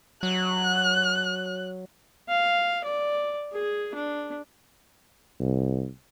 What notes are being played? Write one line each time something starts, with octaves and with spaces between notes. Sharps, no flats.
F#3 F#6
F5
D5
G#4
D4
C2